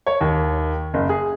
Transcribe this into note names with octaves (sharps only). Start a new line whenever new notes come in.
C#5
D#2
F#1
G#4